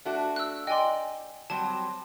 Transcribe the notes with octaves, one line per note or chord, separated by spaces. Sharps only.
A3 D4 F#4
E6 F#6
D5 D#5 G5 G#5 C6
F#3 G3 C4 A5